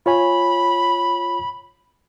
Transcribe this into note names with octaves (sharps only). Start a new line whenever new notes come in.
F4 C#5 G#5 B5